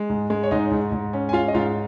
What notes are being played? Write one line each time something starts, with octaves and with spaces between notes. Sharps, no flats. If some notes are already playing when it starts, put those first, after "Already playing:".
Already playing: G#3
G#2
G#3
C#5
G#2 D#4 D#5
G#2
G#2
C#4
G#5
G#3 F4 F5
D#5
G#2 F4 F5